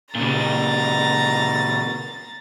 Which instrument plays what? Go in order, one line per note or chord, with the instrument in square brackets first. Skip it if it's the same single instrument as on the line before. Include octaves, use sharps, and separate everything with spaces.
[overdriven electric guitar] A#2 C#3 [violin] A#5 A6